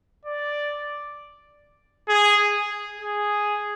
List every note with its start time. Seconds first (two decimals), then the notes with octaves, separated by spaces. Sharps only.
0.26 D5
2.09 G#4
3.01 G#4